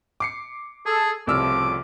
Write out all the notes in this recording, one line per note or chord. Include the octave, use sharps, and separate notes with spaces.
D6 C7 C#7
G#4 A4
C2 A2 C#3 F3 D6 E6 F6